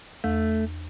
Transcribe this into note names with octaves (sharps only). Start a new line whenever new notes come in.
E2 A3